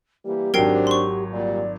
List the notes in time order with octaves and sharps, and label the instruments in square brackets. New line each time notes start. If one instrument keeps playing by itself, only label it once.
[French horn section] E3 G3 A#3 [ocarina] G4
[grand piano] G#1 F#3 [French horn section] D4 C5 [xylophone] A#4 G5 C7
[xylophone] C6 C#6
[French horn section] A#2 G3 [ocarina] D5